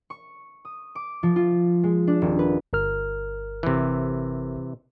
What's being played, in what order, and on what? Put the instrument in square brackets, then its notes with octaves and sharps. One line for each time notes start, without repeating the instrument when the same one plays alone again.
[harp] C#6
D#6
D6
F3
F4
G#3
D4
D#1
B4
[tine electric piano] G1 A#4 F6
[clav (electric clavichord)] C3 E3